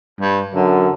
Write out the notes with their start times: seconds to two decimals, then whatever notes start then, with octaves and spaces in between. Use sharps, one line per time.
0.20 G2
0.54 F#2 D3